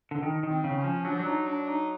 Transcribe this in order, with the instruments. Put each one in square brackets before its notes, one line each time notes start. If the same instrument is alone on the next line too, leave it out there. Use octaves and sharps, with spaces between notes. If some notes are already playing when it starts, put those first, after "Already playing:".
[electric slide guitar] D3
D#3
D#3
[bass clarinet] C4
[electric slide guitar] C#3
[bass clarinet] C#4
[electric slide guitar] F3
[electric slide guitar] F#3 [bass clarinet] D4
[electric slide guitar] F3
F#3
[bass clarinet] D#4
D4
D#4